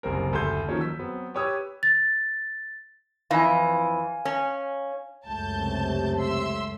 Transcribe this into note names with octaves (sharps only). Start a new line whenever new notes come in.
F#1 C2 C4 A#4
F#1 D2 A4 B5 C6 G6
D#3 F3 F#3 A#3 C#4
E6 B6
F#3 B3 C4
G4 B4 C#5 D#6 E6
A6
F2 E3 F5 G#5
C#4
C#2 F#2 A3 A5 G6
C3
E5 C6 E6